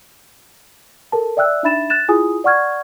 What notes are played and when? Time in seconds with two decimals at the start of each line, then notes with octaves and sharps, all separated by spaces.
1.12 A4 A#4 A5
1.37 D5 E5 G5 E6 F#6
1.63 D4 D#4 E5 B5 A6 E7
1.90 F#6 A6 E7
2.08 E4 F4 G#4 G#5 D#6
2.44 D5 F#5 C#6 F6 G#6